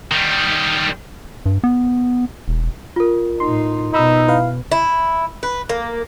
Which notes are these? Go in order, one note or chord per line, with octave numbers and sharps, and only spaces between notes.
D#3 G3
G2
B3
E1
F4 A#4
A2 D#4 C6
B2 D#4 B5 E6
E4 B4 F5
E4
B4
A#3